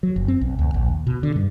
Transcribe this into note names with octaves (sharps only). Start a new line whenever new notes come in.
F#3
F#1
C4
B1
D2
A#1
D#2
B2
D3
G2